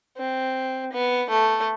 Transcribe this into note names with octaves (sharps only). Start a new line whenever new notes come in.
C4
B3
A3